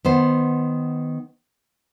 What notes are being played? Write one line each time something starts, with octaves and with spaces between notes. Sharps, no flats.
D#3 B3 C5